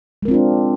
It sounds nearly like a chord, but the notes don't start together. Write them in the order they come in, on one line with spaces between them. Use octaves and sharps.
G#3 A#4 C4 F4 D4